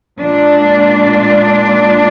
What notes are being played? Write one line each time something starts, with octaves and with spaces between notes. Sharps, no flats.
A#2 G#3 D4